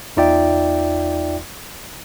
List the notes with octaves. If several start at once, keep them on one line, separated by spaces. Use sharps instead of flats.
E2 D#4 F4 D5 E5 G5